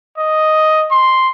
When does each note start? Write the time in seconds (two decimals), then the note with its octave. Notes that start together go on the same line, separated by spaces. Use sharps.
0.18 D#5
0.91 C6